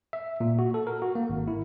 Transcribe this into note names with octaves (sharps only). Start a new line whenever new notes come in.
E5
A#2
F#4
A4
A#4
F#4
A#3
G#1
E4